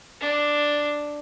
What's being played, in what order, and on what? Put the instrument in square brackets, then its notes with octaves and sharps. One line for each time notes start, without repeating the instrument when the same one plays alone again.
[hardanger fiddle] D4